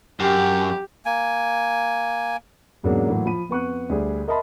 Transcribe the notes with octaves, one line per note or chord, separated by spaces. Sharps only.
F#2 G4
A#3 G#5
E2 G#2 C#3 F#3 A#3 D4
A2 E3 F#3 A3 A#3
F3 B5 D#7
F2 B3 C#6 F#6
D2 G3 G#4
A#4 D#5 E5 A5 B5 C6